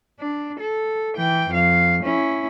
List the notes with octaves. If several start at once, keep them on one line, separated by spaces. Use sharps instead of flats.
D4
A4
E3 G5
F2 F5
C#4 E4